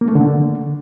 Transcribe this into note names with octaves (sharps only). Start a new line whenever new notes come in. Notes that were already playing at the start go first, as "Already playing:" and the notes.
A#3
A3
D3